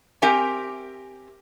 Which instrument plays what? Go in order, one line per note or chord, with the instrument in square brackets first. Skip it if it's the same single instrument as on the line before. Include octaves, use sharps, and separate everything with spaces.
[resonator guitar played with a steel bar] C4 G4 A#4 E5 G5 G#5